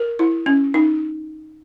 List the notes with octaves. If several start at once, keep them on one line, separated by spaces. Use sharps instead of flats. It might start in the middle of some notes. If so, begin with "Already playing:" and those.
Already playing: A#4
E4
C#4
D#4